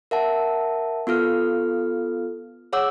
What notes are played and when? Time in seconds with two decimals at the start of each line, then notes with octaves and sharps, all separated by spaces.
0.11 A#4 E5 F#5 A5
1.07 B3 F4 A4 F6
2.73 G#4 C#5 F#5 D6 E6